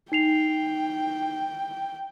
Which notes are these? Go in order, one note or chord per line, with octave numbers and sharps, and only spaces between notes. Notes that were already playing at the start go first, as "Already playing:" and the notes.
D#4 G5 C7 F7